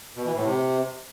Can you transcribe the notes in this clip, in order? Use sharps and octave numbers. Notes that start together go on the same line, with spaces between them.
B2
E3
A2
C3